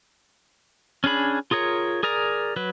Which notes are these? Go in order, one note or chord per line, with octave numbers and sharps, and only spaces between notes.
C#4 D4 G#4 B5
F4 G#4 A#4 C#5
G#4 A#4 D5 A#5
F#3 B4